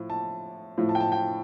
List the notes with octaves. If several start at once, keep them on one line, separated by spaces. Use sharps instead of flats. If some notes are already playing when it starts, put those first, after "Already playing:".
Already playing: A2 F3
A5
A2 F3
A5
G5
A5
G5